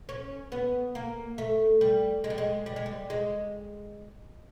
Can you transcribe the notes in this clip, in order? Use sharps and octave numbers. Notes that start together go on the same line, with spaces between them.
C#4
B3
A#3
A3
G3
G#3
G3
G#3
G3
G#3
G3
G#3